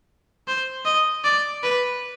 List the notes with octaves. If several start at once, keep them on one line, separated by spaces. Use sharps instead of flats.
C5
D#5
D5
B4